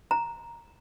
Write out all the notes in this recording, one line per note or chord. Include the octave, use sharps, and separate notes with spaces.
A#5